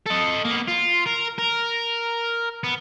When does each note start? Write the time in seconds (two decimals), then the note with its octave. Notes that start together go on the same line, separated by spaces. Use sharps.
0.06 A4 D#5
0.44 A#3 B3
0.68 F4
1.06 A#4
1.38 A#4
2.64 B3